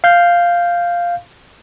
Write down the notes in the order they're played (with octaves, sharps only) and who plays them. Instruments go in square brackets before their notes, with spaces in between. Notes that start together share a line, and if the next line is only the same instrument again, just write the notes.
[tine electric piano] F5 G6